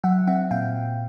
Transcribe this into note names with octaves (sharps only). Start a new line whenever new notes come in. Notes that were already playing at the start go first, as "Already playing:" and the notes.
F#3 E5 F#5
C4 E5 F#5
A#2 F5 G5